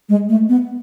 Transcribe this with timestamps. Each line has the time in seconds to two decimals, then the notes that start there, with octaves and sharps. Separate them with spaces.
0.09 G#3
0.29 A3
0.49 B3